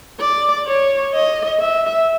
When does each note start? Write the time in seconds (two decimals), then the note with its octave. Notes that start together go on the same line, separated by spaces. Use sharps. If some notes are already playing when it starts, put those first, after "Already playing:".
0.20 D5
0.67 C#5
1.14 D#5
1.60 E5